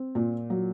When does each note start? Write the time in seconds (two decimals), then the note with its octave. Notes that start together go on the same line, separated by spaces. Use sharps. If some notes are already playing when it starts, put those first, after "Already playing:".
Already playing: C4
0.15 A#2
0.50 F#3